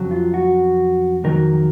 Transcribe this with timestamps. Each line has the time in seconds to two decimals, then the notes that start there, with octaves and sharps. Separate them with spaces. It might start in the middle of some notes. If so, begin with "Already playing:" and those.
Already playing: F2 C#3 F#3
0.11 F4
0.34 F#4
1.24 F2 D#3 F#3 A#4